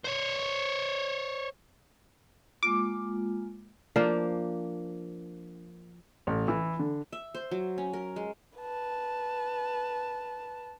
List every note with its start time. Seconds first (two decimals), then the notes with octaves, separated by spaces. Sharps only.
0.05 C5 C#5
2.63 G#3 A#3 F4 D6
3.96 F3 A#3 D4
6.27 A1
6.48 E3
6.79 D3
7.13 E5
7.35 C5
7.51 F#3
7.78 C#4
7.93 A#4
8.16 G#3
8.58 B4 A5